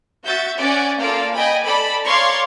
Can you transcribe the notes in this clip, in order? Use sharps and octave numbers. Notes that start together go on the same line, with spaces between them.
F#4 E5 G6 A6
C#4 D5 F#5 G#5
A#3 F4 A4 D5 F5
D#5 G5 G#5 B5
A4 D5 B5
C#5 D5 F5 A#5 C6 C#6